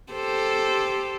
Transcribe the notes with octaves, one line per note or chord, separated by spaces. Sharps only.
G4 A4 C5